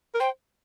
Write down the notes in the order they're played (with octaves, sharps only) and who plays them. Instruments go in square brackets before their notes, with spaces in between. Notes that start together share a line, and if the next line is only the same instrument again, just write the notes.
[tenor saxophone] A#4
[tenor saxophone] C5 [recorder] G5